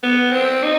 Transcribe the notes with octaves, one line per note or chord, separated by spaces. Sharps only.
B3
C4
D#4